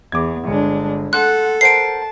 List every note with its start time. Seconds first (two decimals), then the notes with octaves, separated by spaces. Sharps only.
0.12 E2 D6 G#6
0.47 G1 G#3 D4
1.13 A4 F#5 C6 F#6
1.61 A#4 C5 F#5 A5 C7 D7